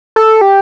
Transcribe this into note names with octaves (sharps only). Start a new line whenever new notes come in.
A4
G4